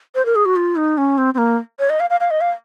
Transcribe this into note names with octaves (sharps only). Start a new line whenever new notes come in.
C5
A#4
G#4
F#4
F4
D#4
C#4
C4
C4
A#3
C#5
D#5
F5
F5
F5
D#5
F5